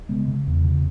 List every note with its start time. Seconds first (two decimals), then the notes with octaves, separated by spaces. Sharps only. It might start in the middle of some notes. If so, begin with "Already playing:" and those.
0.09 C#3 G#3 B3
0.28 C#3
0.47 E2
0.64 C#3